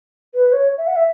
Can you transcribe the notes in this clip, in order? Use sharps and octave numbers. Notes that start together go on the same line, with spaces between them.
B4
C#5
E5
F#5
E5